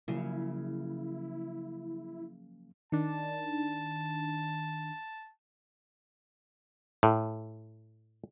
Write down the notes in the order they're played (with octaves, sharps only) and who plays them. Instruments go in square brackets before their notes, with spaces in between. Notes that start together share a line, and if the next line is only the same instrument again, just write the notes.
[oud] C#3 [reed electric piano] F3 F#3 A#3 [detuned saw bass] E4
[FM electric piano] D#3 D4 [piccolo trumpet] A5
[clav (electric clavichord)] A2